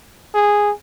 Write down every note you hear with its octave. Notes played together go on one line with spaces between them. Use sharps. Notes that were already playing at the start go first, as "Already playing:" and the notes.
G#4